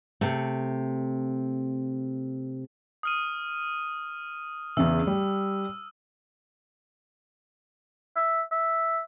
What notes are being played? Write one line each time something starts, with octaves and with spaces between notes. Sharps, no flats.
C3 A3
D#6 F6 D#7
E2 C#3 E3 E6
G3
E5
E5